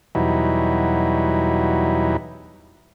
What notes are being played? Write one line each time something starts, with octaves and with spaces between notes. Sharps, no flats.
E2 B2 F#3 G3 D#4 E4